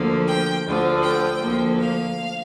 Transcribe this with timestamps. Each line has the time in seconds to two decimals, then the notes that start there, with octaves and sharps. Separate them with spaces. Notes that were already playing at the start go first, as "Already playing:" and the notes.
Already playing: D2 D3 F3 A#3
0.27 G5
0.65 D2 D3 F3
1.03 G5
1.41 D2 D3 F3 A#3
1.79 F5